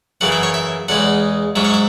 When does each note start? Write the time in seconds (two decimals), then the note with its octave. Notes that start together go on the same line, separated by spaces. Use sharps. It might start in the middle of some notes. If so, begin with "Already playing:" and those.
0.21 F#2 C#3 E3 F#5
0.32 E5
0.43 C#5
0.54 E5
0.88 E2 C#3 G#3 F#5
1.56 G#2 F#3 C#4 E5
1.65 C#5
1.74 E5